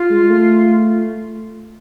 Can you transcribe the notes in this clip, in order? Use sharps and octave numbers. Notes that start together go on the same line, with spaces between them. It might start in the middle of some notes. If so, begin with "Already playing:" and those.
Already playing: F4
G#3
A3